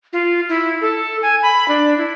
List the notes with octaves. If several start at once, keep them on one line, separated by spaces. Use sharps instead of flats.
F4
E4
A4
G#5
B5
D4
E4